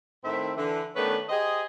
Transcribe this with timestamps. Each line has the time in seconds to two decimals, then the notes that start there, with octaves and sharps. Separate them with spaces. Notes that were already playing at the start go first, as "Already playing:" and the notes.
0.24 A2 D#3 C4 E5
0.56 D3 E3
0.95 D#3 A3 B3 C#4 D4 B4
1.29 G4 G#4 C5 D#5